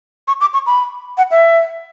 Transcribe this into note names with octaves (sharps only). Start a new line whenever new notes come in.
C#6
D6
C#6
B5
F#5
E5